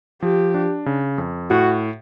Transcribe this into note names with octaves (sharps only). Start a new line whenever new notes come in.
F3 G4
D4
C#3
F2
A2 F#4